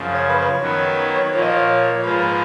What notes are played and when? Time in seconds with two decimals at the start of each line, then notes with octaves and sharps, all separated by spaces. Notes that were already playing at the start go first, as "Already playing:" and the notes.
Already playing: F#2 C#3 F3
0.14 C#5
0.29 B4
0.38 C#5
0.62 D#3 F#3 B3
1.33 A#2 F3 A#3 C#5
1.42 D#5
1.49 C#5
2.04 G#2 F3 A#3 F4 G#4 B4